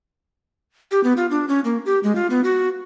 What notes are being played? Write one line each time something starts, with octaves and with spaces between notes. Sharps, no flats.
G4
B3
F4
D4
C#4
A#3
G4
G#3
F4
B3
F#4